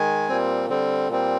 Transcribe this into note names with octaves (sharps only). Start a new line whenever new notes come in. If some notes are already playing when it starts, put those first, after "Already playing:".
Already playing: D#3 G#3 G#5
A#2 G3 C4
D3 G3 C4
A#2 G3 C4